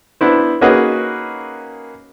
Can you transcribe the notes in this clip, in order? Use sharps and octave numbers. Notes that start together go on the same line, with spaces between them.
B3 D4 E4 C5
A#3 C#4 D#4 F#4 G#4 B4